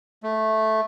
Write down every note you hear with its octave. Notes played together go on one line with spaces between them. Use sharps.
A3